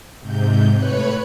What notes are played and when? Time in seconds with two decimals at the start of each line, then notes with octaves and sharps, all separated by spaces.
0.20 G#2 C3 G6
0.74 A2 B4 C#5 B5 F#6 C#7